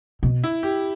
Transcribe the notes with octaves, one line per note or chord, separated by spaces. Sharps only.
B2
E4
G4